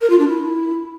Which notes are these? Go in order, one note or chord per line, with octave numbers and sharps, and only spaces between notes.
A#4
F4
D4
E4